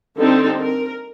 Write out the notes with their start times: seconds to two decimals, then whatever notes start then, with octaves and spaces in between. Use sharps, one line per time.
0.17 D3 G3 C4 D#4 A4
0.60 A#4